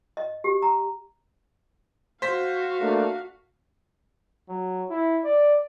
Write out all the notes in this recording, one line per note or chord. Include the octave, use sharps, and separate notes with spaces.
D#5
G4
A#5
F#4 C5 F5 B6
A3 A#3 D4
F#3
E4
D5